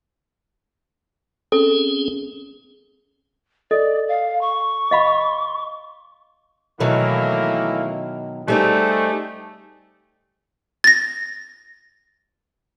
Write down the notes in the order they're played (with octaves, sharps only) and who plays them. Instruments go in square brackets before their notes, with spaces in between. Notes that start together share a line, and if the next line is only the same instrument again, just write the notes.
[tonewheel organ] C4 C#4 G#4 [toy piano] A4
[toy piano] A4 D#5 [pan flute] D5
[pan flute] F5
C#6
[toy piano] D#5 F5 B5
[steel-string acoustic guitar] B2 D#3 F#3 [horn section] E3 A3 A#3
[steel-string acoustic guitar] G3 C4 D#4 [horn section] A3 G4 G#4
[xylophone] A6 A#6